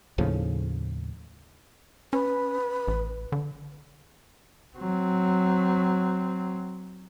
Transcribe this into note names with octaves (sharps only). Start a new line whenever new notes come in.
D#2 A2 C#3 F3
C#4 B4
A1
D3
F#3 C4